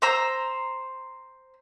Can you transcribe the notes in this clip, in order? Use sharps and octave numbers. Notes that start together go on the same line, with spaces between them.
C5 A#5 E6